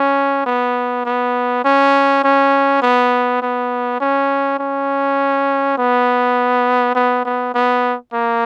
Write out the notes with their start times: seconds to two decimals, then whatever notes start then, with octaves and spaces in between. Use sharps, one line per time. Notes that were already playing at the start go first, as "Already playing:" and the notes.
Already playing: C#4
0.46 B3
1.05 B3
1.65 C#4
2.24 C#4
2.82 B3
3.42 B3
4.00 C#4
4.59 C#4
5.78 B3
6.95 B3
7.25 B3
7.54 B3
8.13 A#3